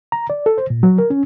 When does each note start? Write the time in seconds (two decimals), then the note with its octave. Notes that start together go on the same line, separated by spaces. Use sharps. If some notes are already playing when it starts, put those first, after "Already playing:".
0.12 A#5
0.30 D5
0.46 A4
0.58 C5
0.70 A#2
0.83 F#3
0.98 A#4
1.10 C#4